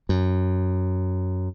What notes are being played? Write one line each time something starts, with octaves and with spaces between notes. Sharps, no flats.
F#2